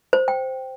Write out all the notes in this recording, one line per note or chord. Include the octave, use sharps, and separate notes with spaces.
C5
G5